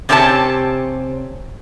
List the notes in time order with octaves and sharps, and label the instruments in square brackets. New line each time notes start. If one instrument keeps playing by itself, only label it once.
[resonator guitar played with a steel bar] C3 C4 C#4 G4 B4 A5